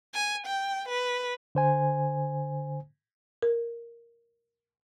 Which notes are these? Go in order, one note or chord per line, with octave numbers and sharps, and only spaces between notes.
G#5
G5
B4
D3 C5 G#5
A#4